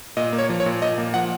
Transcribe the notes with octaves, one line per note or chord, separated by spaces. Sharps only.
A#2 D#5
A#3
C#5
F3
C#5
A#2
A#2 D#5
A#3
F3 F#5